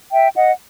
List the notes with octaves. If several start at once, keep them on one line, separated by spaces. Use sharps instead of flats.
E5 G5
D#5 F#5